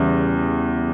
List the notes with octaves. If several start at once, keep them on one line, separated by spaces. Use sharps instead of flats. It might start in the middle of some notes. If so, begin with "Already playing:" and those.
Already playing: E2 C#3 G3